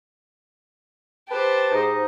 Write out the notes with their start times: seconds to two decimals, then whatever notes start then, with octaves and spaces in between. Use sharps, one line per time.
1.29 G4 B4 C5 A5
1.70 G#2 D#4